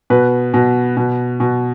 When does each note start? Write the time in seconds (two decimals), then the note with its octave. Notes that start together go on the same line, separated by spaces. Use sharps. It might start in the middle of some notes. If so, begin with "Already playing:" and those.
0.10 B2 B4
0.54 B2
0.97 B2
1.40 B2